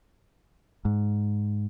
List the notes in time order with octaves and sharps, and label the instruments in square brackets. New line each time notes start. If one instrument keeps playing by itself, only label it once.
[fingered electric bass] G#2